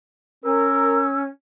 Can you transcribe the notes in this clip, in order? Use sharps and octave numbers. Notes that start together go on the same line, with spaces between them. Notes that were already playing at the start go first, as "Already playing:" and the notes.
C#4 A#4 E6